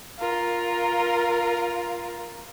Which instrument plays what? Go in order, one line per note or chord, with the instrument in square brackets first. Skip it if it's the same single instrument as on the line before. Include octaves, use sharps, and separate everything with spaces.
[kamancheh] F4 A#4